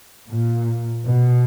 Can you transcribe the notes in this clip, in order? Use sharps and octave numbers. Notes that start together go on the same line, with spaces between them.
A#2
B2